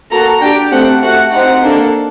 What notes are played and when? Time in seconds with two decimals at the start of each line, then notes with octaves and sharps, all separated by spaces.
0.11 A#3 F#4 A4 A#5
0.41 D4 G4 G5
0.71 A3 C4 G4 F#5
1.01 A3 C4 F#4 F#5
1.31 C4 D#4 G4 F#5
1.62 A#3 D4 A4